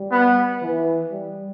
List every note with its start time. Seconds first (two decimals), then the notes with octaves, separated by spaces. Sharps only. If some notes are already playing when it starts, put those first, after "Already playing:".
Already playing: G3
0.12 B3
0.62 E3
1.12 G3